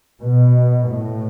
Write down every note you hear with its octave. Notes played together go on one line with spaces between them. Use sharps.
B2
A2